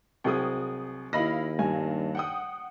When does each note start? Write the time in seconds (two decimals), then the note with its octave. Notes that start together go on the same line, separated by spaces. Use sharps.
0.24 C2 F#3 G#4 G5 D#6
1.13 D#2 E4 D#5 F5 B5 A#6
1.59 G2 G#5
2.15 F#5 G5 D#6